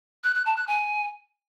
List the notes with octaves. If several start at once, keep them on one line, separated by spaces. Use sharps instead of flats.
F#6
F#6
A5
F#6
G#5